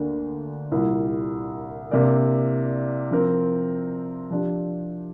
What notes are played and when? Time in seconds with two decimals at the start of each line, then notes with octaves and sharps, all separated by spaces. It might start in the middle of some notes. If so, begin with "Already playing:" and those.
Already playing: D2 D3 A#3 D4 A#4
0.72 C2 A#2 G3
1.91 C3 A#3 D4 A#4 D5
3.11 F3 C4 A#4
4.30 F3 D4 G4